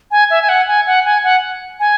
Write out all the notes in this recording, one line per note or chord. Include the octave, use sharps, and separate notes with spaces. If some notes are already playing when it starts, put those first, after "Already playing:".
G#5
E5
G#5
F#5
G#5
F#5
G#5
F#5
G#5